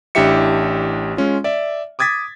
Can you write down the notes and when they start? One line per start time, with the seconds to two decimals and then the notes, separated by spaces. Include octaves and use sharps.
0.15 A1 D4 E4 G4 E5 C#7
1.17 G#3 C#4 F4
1.44 D5 E5
1.99 D6 D#6 G#6 A6 B6